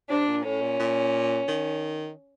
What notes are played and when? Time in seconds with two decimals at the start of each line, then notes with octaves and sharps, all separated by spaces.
0.10 C3 D4
0.28 A#2
0.45 A2 C#4
0.62 A#2
0.79 A#2
1.48 D#3